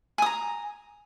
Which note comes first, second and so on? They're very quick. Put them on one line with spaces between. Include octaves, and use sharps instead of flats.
G#5 D#6 A#5